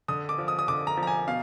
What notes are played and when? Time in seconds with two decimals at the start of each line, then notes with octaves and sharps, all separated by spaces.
0.08 D3 D#6
0.29 D6
0.38 F3
0.48 D#6
0.59 D#6
0.68 D3 D6
0.87 A#5
0.97 F3
1.03 A#5
1.07 G#5
1.28 B2 F5